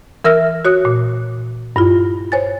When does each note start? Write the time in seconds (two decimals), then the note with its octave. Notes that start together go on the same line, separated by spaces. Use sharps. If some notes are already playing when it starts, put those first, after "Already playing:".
0.24 E3 A#4 E5 E6 F6 A#6
0.65 F#4 C#5 D#6 F#6
0.85 A#2
1.76 G2 E4 F4
2.32 C5 C#5 G#5 A6